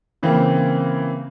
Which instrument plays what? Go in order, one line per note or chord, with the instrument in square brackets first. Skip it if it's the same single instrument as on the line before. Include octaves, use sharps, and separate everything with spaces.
[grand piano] C#3 E3 A#3 C4